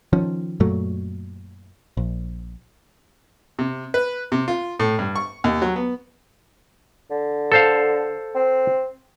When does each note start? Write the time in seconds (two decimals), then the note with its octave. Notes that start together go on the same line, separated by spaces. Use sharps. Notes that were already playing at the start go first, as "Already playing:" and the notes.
0.13 D#3 F3 C#4
0.60 F#2 A#2 F#3 A3
1.97 A#1
3.59 C3
3.94 B4
4.32 C3
4.48 F4
4.80 A2
4.99 G2
5.16 C#6
5.44 D#2
5.62 F#3
5.76 B3
7.11 D3
7.52 A4 C5 F5
8.35 C4